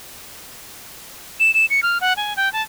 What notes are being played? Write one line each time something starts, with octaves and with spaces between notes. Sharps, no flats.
E7
E7
C#7
F6
F#5
G#5
G5
A5